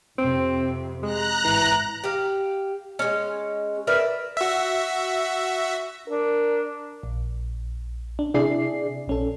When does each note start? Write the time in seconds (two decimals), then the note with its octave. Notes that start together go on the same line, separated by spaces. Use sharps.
0.19 F2 C3 C4
1.03 G#3 A#5 F#6
1.45 G#1 E3
2.04 G4 F5
2.99 G#3 C#4
3.87 A#4 B4 D5 E5
4.37 F#4 E5
6.08 D4 A#4
7.03 A#1
8.19 D4
8.34 C3 D4 E4 G#4 D5 C7
9.07 A#1 C#4 A4